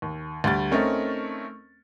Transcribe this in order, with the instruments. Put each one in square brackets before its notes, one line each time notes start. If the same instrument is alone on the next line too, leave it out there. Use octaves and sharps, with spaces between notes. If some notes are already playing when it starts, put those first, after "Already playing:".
[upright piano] D#2
D2 G3 A6
A3 C4 C#4 D#4 A#4